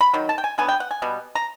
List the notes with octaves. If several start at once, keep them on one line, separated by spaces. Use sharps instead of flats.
B5
D#3 F#3
A5
G5
G#5
D3 F#3 B3 G#5
G5
F#5
G#5
B2 G3 B3
A#5